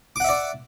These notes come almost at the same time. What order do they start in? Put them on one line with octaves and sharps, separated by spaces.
D6 F#5 E5 D5